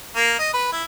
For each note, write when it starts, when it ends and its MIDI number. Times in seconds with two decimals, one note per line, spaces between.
0.15 0.34 58
0.39 0.51 75
0.53 0.68 71
0.72 0.83 64